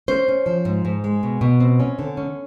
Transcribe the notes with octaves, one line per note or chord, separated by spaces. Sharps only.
C#4 C5
C#4
F3
G#2
G#2
G#3
B2
B2
C4
C#4
D3
C#4